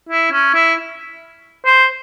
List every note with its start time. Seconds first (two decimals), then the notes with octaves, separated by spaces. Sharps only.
0.09 E4
0.32 C#4
0.54 E4
1.66 C5